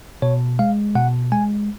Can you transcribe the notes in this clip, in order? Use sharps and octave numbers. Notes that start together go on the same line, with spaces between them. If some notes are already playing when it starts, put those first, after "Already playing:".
B2 C#5
G#3 F5
B2 F#5
G#3 G#5